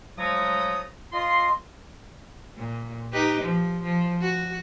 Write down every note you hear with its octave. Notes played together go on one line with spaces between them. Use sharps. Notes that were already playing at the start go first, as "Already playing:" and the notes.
F3 F#3 G#3 A3 A#5 D#6
F4 D#5 C6
A#2
D#4 G4 B4
F3
F3
F#4